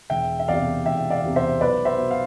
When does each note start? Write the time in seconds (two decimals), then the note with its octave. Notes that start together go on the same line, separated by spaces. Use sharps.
0.10 E1 E5 G5
0.39 E5
0.48 E2 C3 D5 F5
0.85 E1 E5 G5
1.10 D5 F5
1.23 E2 C3
1.36 C5 E5
1.61 B1 B4 D5
1.85 C5 E5
1.98 B2
2.11 F5